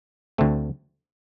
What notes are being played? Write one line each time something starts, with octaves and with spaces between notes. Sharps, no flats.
D2 D3 A3 C4